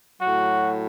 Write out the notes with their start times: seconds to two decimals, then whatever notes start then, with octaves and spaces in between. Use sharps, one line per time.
0.19 A2 F#3 F#4